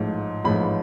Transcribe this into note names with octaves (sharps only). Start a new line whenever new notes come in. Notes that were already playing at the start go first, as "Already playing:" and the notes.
Already playing: A1 G#2 F3 A3
A1 G#2 F3 A3 B5